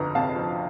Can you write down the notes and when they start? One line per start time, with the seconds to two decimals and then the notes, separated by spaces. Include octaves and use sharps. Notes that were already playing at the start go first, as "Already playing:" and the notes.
Already playing: G1 F2 A#5
0.15 C3 F5 A5
0.36 F3